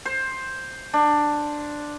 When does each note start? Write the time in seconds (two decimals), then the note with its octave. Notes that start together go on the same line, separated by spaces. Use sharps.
0.05 C5
0.93 D4